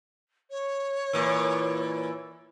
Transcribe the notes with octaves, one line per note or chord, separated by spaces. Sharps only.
C#5
A#2 E3